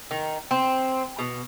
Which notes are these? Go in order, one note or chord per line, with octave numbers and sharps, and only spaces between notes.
D#3
C4
B2